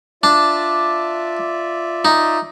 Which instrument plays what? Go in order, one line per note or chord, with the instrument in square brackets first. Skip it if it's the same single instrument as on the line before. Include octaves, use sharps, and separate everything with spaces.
[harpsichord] D4 [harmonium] F4 D5 E5
[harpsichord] D#4